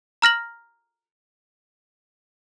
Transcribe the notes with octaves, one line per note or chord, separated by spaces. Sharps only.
A#5 F6 A#6 F#7